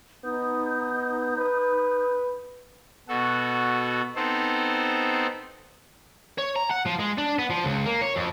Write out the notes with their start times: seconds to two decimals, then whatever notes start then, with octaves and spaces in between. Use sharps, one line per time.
0.24 B3 D#4 D#6 G6
1.38 B4
3.08 B2 F#4 A4
4.16 B3 C4 D#4 A4 C5
6.38 C#5
6.56 A#5
6.71 F#5
6.87 F3
7.00 G#3
7.18 D4
7.39 B3
7.50 F3
7.65 C#2
7.86 A#3
8.01 C#5
8.16 F2